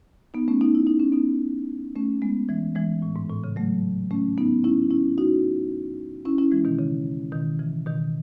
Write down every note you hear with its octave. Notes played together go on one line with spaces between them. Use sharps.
B3 D#4
A3 C#4
B3 D#4
E4
D#4
C#4
B3 D#4
A3 C#4
G#3 B3
E3 G#3
E3 G#3
A2
G#2
A2
C#3
F#3 A3
A3 C#4
B3 D#4
C#4 E4
C#4 E4
D#4 F#4
C#4 E4
C#4 E4
E3 G#3
B2 D#3
C#3
B2 D#3
C#3 E3
B2 D#3